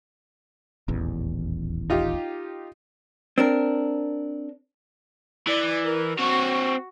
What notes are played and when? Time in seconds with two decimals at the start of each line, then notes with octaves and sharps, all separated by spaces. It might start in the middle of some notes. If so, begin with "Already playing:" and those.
0.88 D#1 A1 E2
1.90 D#4 F4 G4
3.38 C4 D4 A#4
5.47 E3 D5
5.84 A#4
6.19 C4 F#4 C#5